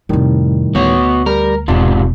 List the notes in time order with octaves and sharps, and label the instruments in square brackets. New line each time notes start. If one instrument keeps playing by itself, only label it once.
[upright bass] F2 C3 [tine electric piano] A2 D#3 G3
[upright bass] D2 [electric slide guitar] B3 F#4 C#5
[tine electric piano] G3 [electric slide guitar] A#4
[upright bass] E1 [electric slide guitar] G#2 C3 D4 [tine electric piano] F4